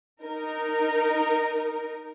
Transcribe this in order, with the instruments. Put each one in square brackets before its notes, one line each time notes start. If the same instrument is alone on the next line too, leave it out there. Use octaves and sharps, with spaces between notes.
[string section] D#4 A#4